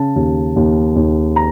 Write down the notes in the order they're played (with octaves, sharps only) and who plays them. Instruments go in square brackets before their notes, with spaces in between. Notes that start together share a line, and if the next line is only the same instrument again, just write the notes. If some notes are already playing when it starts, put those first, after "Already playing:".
Already playing: [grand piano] C#3 A5
D#2
D#2
D#2
A#5